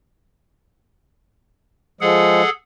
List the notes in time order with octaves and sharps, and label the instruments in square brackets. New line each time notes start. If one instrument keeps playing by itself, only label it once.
[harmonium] F3 G#3 [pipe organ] G#4 A4 F#5